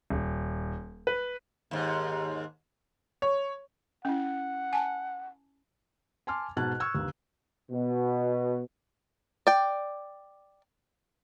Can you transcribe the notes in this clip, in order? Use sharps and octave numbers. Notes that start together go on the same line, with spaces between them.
D#1
B4
D#2 G#2
C#5
C#4 E4 F#5
G#5 A5
G#5 A5 C6 D6 F6
G#2 B2 A5 F#6 G#6
C#6 E6 F6 G#6
G1 D#2
B2
D5 G5